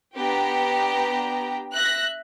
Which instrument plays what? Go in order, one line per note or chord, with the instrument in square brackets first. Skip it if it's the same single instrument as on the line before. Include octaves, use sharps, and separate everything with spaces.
[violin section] B3 D4 G4 G5 A#5
E5 F#6 A#6